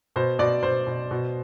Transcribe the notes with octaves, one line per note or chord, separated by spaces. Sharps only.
B2 C5
B2 D5
B2 C5
B2
B2